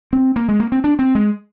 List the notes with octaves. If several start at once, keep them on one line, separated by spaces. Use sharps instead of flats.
C4
A#3
G#3
A#3
C4
D4
C4
G#3